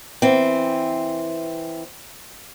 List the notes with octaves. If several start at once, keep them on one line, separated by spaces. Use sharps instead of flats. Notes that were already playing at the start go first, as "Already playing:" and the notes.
E3 C4